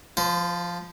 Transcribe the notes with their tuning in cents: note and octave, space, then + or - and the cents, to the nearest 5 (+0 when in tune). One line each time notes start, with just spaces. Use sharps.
F3 +0 C5 -40